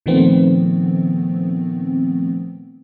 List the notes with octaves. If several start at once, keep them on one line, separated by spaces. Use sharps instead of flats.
A#2 D#3 F3 A3 B3 C4